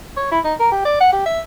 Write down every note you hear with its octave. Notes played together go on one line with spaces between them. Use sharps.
C#5
E4
D#4
A#4
G4
D5
F#5
G4
E5